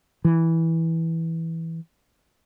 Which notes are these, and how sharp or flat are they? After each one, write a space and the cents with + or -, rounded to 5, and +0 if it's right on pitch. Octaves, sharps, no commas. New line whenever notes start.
E3 -10